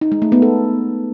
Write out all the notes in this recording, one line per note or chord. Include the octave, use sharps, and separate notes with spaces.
D#4
G#3
A3
B3
A4